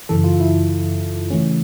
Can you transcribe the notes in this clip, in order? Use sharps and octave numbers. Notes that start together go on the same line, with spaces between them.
F#2 C#3 E3 A4
F4
E4
C#3 E3 A3 C#4